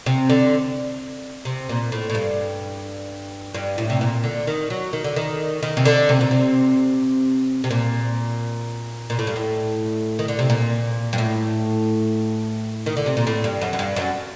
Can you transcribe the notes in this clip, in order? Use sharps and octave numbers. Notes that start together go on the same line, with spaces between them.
C3
D3
C3
A#2
A2
A2
G2
G2
A2
C3
A#2
D3
D#3
F#3
D#3
D3
D#3
D#3
C3
D3
C3
A#2
C3
C3
A#2
A#2
A2
G2
A2
D#3
D3
C3
A#2
G2
A2
D#3
D3
C3
A#2
A2
G2
F#2
F#2
G2
F#2